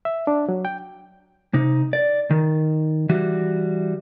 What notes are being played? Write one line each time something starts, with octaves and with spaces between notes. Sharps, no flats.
E5
D4
F#3
G5
C3 D#4
D5
D#3
E3 G3 F#4